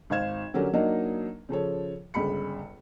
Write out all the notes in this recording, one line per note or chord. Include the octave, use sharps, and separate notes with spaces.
G#1 D#4 C5 F5 G#6 E7
D3 F#3 C#4 G4 A#4
F#3 A#3 D4 D#4 A#4 D#5
C#3 F3 A4 C#5
G1 C#2 C#3 B5 C#7